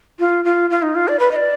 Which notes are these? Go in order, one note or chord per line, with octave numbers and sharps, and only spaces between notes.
F4
F4
F4
D#4
F4
D5
B4
D#5
D5